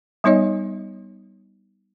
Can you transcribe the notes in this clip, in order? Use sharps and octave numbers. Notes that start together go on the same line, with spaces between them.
G3 B3 D#4 C#5 D#5